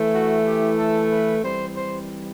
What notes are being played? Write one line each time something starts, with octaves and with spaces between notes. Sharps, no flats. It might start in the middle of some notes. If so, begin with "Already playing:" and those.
Already playing: E3 A3 E4
F#4
G4
A4
B4
E3 G3 C4 C5
C5